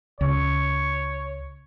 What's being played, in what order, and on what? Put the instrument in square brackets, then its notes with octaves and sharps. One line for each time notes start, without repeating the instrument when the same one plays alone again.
[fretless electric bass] C#2 [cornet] C#5